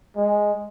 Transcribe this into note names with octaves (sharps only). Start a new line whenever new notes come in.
G#3